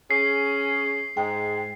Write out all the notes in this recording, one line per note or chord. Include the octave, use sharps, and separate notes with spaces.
C#4 G#4 C7
G#2 G#3 G5